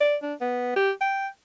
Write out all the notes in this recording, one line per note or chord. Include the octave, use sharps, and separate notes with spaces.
D5
D4
B3
G4
G5